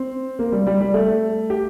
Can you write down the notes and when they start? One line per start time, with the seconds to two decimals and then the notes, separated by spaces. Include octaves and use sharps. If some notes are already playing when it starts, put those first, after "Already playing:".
Already playing: C4
0.39 A#3
0.52 G3
0.67 G3
0.81 G3
0.94 A3
1.50 G4